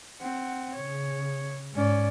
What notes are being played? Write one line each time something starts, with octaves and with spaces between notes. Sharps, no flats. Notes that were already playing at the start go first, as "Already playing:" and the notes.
C4 F#5
C#3 C#5
G#2 C#4 D5